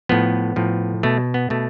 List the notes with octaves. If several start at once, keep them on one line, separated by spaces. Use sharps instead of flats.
A2 F3 B3
A2 F3
B2 A3
B3
B2 A3